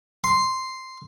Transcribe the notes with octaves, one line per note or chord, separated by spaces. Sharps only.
C6